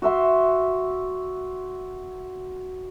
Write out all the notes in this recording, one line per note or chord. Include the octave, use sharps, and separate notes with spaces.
F#4 E5 C6